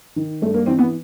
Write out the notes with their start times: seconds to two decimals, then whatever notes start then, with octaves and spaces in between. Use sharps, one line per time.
0.16 D#3
0.42 G2 A3
0.54 A#3
0.66 E3 C4
0.79 B3